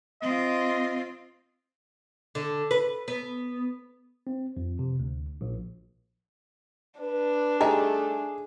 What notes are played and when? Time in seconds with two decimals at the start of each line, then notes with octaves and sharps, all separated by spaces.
0.22 C4 F4 D#5
2.35 D3
2.71 B4
3.08 B3
4.27 C4
4.57 F2
4.79 C3
5.00 D2
5.41 A#1
7.00 D4 B4
7.61 G3 A3 D#4 E4 G#4